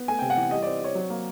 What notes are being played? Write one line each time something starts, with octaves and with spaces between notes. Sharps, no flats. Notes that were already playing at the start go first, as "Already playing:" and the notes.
Already playing: B3
A3 G#5
C3 G5
F#5
E3
G3 D#5
C4 D5
C4 C#5
F#3
A#3